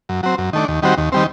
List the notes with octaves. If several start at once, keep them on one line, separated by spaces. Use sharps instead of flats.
F#2
F#3 C4
F#2
D#3 A3 D4
D#2
D#3 G3 C4 F#4
D#2
D#3 G3 C4